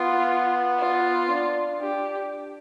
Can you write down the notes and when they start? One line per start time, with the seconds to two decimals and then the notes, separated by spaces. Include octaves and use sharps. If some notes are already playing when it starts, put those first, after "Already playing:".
Already playing: B3 F4
0.79 F4
1.30 D4
1.81 D4 G4